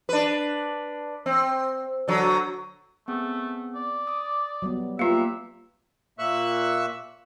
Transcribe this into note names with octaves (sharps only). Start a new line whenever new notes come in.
D4 B4
C4
D3 F#3
A3 B3 C4 G#4
D5
D6 D#6
F#3 G3 B3
A#3 F4 G4 B4 E5 F5 A#5
A#2 A#3 E5 C#6 E6 F#6